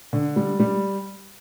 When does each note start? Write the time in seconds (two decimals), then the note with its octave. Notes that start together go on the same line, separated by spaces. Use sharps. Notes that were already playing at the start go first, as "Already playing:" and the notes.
0.13 D3
0.36 G3
0.59 G3